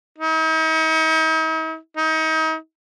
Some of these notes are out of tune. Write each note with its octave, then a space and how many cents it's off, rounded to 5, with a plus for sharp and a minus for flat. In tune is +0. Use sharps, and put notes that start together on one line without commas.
D#4 +45
D#4 +35